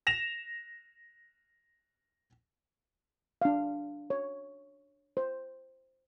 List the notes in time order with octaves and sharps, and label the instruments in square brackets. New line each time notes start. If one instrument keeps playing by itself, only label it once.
[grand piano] A#6 E7 F7
[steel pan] D4 F5
C#5
C5